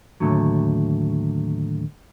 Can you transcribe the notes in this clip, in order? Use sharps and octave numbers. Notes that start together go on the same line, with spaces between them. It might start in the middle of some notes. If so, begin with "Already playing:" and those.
D#2 A2 D3 F#3